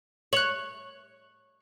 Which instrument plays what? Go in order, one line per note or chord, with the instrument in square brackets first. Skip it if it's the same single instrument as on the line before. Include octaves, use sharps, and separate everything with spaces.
[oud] C#5 [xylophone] F#6 F#7